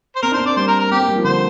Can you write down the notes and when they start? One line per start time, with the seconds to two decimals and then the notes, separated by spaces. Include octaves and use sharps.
0.16 C5
0.23 C4 A#4
0.32 D4 C5
0.40 C4
0.46 A#3 D5
0.56 G3 C5
0.68 A#4
0.80 A#4
0.91 C4 G4
1.00 A#3
1.08 G3
1.16 F3
1.24 D3 C5